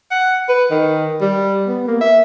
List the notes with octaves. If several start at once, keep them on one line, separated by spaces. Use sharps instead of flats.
F#5
B4
D#3
G3
B3
A#3
E5